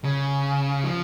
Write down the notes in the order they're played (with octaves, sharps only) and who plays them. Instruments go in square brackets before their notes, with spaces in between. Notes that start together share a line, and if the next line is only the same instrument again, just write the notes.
[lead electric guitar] C#3
F3